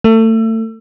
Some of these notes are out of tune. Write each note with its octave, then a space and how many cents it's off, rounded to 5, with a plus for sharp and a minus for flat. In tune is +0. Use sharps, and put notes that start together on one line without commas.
A3 +30